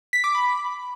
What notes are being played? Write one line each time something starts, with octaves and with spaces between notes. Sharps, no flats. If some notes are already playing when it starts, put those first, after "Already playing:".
B6
D6
B5